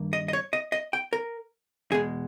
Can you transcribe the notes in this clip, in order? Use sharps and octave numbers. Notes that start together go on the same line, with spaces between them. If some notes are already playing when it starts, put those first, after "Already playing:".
Already playing: G2 D#3 A#3
D#5
D#5
C#5
D#5
D#5
G5
A#4
E2 B2 G#3 G#4